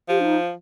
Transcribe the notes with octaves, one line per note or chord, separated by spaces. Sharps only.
F3 G4
D4
D#4